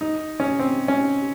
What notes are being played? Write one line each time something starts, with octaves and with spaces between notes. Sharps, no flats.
D#4
C#4
C4
C#4